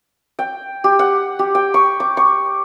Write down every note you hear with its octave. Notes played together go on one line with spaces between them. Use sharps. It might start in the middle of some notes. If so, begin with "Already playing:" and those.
G5
G4
F#5
G4
G5
C#6
D6
C#6